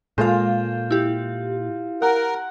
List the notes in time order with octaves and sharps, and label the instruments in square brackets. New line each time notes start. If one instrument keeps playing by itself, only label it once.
[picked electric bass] A#2 [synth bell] G#3 A4 F5 [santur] F4 C5
[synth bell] E4 G4
[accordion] A#4 [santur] F#5